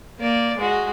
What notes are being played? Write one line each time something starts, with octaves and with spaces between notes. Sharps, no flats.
A#3 D5
G#3 F#4